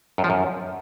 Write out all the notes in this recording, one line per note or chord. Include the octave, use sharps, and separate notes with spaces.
F#2
F3
F#2